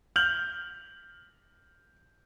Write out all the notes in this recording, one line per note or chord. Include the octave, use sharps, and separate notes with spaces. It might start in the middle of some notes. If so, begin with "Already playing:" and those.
F6 G6 F7 F#7